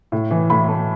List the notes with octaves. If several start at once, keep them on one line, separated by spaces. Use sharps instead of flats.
A2
E3
A2 B5
A3